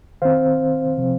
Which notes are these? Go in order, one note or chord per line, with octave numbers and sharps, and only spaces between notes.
D#3 C4 C5 F5
C3 F3 C4